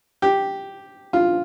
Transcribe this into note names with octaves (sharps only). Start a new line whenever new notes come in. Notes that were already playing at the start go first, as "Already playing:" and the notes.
G4
F4